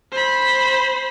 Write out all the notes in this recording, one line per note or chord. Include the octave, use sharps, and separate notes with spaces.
C5 B5